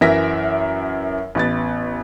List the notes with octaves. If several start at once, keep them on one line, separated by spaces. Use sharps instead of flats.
F#2 E3 A#4 E5 A#6 B6
A1 B3 A6